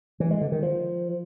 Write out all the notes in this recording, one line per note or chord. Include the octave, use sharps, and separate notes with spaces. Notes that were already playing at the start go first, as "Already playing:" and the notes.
E3
G#3
D3
D#3
F3